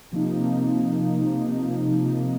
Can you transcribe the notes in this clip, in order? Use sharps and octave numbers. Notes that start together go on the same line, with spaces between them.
C3 F3 A#3 D#4